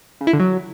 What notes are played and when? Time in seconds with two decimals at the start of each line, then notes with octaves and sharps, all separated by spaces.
0.21 C#3
0.27 E4
0.33 D3
0.40 F#3